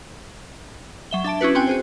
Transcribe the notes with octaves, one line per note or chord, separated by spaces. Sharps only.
F#3 E5 G7
D4 E5 A5 D7
C#4 E4 F#4 B4
C4 C#4 F#4 G5 G#5
F#4 G#4 C5